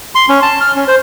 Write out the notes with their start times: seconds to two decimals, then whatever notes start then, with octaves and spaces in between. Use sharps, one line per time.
0.15 C6
0.29 C#4
0.42 A5
0.61 F6
0.76 C#4
0.88 C5